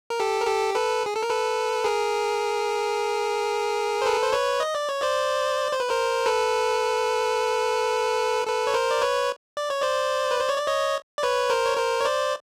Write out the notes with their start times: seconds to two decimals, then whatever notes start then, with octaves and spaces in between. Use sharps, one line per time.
0.10 A#4
0.20 G4 A4
0.41 A#4
0.47 G4 A4
0.74 A4 B4
1.06 G#4
1.15 A4
1.23 A#4
1.29 A4 B4
1.84 G#4 A#4
4.02 C5
4.06 A4 B4
4.23 C5
4.33 B4 C#5
4.60 D#5
4.75 D5
4.89 C#5
5.02 C5 D5
5.72 C5
5.80 B4
5.90 A#4 C5
6.26 A4 B4
8.46 A4 B4
8.67 C#5
8.74 A#4 C5
8.91 D5
9.02 B4 C#5
9.57 D5
9.70 C#5
9.82 C5 D5
10.31 B4
10.40 C5
10.49 C#5
10.58 D5
10.67 C#5 D#5
11.18 D5
11.23 B4 C#5
11.50 A#4 C5
11.65 C#5
11.77 A#4 C5
12.01 C#5
12.05 C5 D5